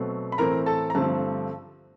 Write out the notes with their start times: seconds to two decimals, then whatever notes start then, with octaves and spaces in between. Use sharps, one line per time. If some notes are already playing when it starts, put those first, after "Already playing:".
Already playing: B2 F#3 A3 C4
0.32 B5
0.38 A2 E3 A3 C4 A#4 A#5
0.66 A4 A5
0.90 A#5
0.95 G2 D3 F3 A3 C4 A4 A5